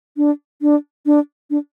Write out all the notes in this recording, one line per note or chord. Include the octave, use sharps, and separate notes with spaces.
D4
D4
D4
D4